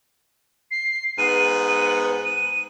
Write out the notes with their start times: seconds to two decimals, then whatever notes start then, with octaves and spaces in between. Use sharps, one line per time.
0.71 C7
1.18 G#2 B3 D#7
2.25 D#7